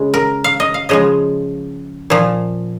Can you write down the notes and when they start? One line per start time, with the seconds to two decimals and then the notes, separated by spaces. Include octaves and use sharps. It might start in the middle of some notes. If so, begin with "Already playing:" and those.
Already playing: C#3 G#3
0.14 A#4
0.44 F5
0.60 D#5
0.74 F5
0.89 C#3 F3 G#3 D#5
2.10 A#2 F3